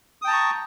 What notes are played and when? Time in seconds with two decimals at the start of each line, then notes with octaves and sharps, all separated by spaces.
0.22 D#6
0.25 G5
0.27 A5
0.30 A#5
0.33 C#6